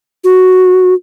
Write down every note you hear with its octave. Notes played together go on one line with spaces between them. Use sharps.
F#4